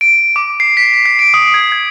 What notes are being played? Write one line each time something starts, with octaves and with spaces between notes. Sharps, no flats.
D7
D6
C7
B6
B6
C7
D7
D#6
G#6
G#6